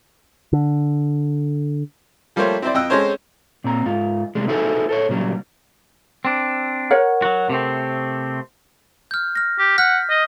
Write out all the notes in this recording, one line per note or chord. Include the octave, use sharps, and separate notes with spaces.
D3
F3 G3 A3 A#3 C5 C#5
C4 E4 C5 D5
F2 D#5 G5 E6 F#6
G#3 C4 C#4 A4 C5 C#5
A#2 C4 A#5
G#2 F4
C3 G3 G#3
D#4 E4 F#4 G#4 A4 C5
A4 C5 C#5
A#2 C#3 F#3 G3
C4 D4
A#4 C#5 F#5
F#3 F#4
C3 A3 C4
F6 G6
F6 A#6
G4
F#5 F6 G6 B6
D#5